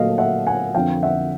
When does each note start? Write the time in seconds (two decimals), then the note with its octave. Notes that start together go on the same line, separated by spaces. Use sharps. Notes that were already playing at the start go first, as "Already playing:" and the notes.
Already playing: A#2 F#3 A3 D#5 F5
0.18 E5 F#5
0.47 F#5 G#5
0.74 F2 D3 F3 F5 G5
1.03 E5 F#5